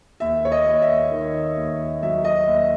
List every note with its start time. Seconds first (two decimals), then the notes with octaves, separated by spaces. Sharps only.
0.20 D#2 E5
0.45 C#5
0.52 D#5
0.66 D#2
0.82 E5
1.11 D#3
1.57 D#2
2.03 F#3 E5
2.24 D#5
2.47 D#2 E5